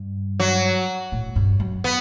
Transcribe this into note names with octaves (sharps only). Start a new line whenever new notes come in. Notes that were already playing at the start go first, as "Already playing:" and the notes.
Already playing: G2
F#3
A2
G2
F#2
B3